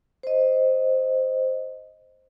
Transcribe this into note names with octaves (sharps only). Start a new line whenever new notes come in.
C5 D#5